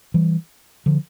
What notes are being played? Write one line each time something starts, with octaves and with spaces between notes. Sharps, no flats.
E3 G3
D3 F3